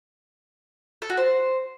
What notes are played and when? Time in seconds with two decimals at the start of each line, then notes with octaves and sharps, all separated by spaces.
1.02 A4
1.10 F#4
1.17 C5